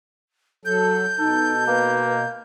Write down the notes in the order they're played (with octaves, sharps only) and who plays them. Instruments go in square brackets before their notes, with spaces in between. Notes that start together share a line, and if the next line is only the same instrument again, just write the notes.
[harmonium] F#3 A4 [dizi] G6
[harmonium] B2 [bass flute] D#4 [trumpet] A4
[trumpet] A#3 [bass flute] B4